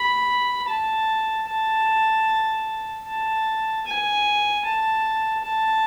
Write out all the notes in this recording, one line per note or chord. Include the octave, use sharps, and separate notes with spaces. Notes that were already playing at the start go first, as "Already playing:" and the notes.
Already playing: B5
A5
A5
A5
G#5
A5
A5